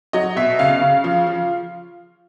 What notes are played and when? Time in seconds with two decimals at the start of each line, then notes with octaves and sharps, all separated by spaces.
0.13 F#3 D#5
0.36 B2 E5
0.59 C#3 F5
0.81 C#3
1.04 F3
1.27 F3